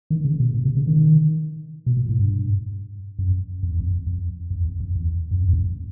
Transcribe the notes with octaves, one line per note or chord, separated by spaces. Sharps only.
D#3
C#3
B2
A#2
C3
C#3
D#3
B2
A#2
A2
G2
F#2
F2
E2
F2
F2
F2
E2
F2
E2
F#2
F2
F#2
F2